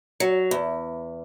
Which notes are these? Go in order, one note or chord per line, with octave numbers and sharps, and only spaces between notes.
F#3
E2